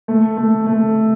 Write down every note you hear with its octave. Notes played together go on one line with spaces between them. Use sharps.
A3
A3
A3